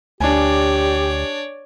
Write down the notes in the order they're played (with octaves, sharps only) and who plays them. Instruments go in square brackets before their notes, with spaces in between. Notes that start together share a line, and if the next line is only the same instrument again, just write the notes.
[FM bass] D2 [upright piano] D4 G#5 [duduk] G4 [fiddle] C#5 D5